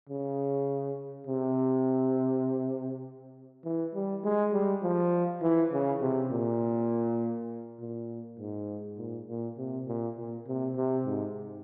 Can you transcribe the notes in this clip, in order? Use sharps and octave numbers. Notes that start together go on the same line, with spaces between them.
C#3
C3
E3
G3
G#3
G3
F3
E3
C#3
C3
A#2
A#2
G#2
A#2
A#2
C3
A#2
A#2
C3
C3
G#2